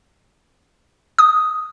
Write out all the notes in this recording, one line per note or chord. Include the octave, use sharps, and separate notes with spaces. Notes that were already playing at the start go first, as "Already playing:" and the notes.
D#6